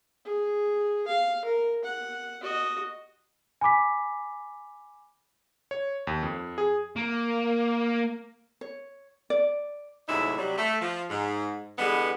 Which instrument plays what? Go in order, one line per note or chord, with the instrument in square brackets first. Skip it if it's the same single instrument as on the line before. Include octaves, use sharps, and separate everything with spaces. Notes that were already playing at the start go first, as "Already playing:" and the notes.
[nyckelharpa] G#4
F5
A#4
F#5
F#4 D#5
[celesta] G#5 B5 D6 B6
[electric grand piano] C#5
D#2
F2
G#4
[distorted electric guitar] A#3
[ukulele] C#5
D5
[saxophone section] D2 G#2 C3 F#3 D#4 E4
C3 F#3 G3
A3
F3
G#2
D3 E3 G3 G#3 B3